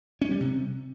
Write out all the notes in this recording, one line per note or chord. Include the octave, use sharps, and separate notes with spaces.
C#4
G3
C3